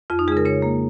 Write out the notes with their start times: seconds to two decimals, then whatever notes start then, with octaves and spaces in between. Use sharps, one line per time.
0.10 F2 F4
0.19 D#4
0.28 G#3 G#4
0.32 C#3
0.37 A#4
0.45 C#3 C#5
0.62 A#3